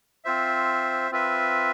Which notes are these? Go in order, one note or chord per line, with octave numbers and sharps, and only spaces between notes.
C4 F4 C5 E5
C4 F4 B4 E5